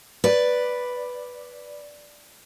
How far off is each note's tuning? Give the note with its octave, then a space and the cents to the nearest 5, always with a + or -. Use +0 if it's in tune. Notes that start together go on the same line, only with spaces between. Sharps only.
B4 +0 D5 +0